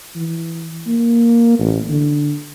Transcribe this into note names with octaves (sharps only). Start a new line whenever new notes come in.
E3
A#3
A1
D3